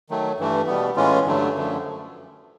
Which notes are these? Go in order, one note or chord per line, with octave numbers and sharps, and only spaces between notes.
D#3 F#3 A3
G2 E3 A3
B2 G3 B3
A2 E3 G#3 C#4 F4
G2 D3 F#3 A3
F#2 D3 F3 A3